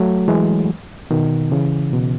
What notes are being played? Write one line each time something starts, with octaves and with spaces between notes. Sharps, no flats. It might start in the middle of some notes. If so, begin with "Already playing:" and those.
Already playing: F#3 A3
E3 G#3
B2 D#3
C#3 E3
B2